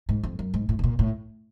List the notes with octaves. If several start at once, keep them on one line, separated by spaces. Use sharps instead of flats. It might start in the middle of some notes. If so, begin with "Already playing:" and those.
G#2
F2
F#2
G#2
A2
B2
A#2
A2